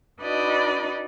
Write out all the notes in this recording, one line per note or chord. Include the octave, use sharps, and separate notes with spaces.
D4 D#4 F#4 B4 D5 D#5